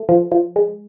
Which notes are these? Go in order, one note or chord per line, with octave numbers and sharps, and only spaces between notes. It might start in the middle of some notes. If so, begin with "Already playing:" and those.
Already playing: A3
F3
F3
G#3